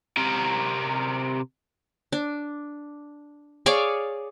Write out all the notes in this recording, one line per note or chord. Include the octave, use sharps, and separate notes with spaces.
C3 A#4
D4
G#4 C#5 D5 F5